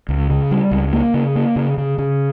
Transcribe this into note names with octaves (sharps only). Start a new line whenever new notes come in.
C#2
C#3
G3
C#2
A#3
C#3
A#3
C#3
C#3
C#3